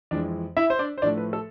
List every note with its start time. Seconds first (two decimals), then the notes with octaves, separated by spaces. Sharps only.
0.11 F2 E3 G#3 D4 D5
0.57 E4 E5
0.70 C5
0.79 D4 D5
0.98 C5
1.02 A2 F3 A3 D4 D5
1.18 B4
1.33 A4